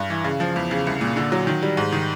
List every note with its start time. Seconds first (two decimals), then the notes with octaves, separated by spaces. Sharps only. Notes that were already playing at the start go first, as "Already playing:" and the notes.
Already playing: G2
0.10 E3
0.24 C#3
0.40 F3
0.56 E2
0.71 C#3
0.87 C2
1.01 A#2
1.17 D3
1.32 F#3
1.47 D#3
1.63 G3
1.77 G#2
1.92 D#3